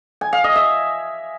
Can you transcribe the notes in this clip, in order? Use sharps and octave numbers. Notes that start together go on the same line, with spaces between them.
G#5
F5
D#5
E5